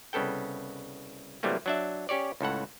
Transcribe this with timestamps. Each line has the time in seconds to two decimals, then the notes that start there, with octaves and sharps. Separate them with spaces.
0.13 C2 C#3 B3 A4 G5
1.43 C3 E3 F#3 G3 A3 A#3
1.66 F#3 D4 E5
2.09 C#4 G4 C#5 D5
2.41 C#2 A2 A4 F#5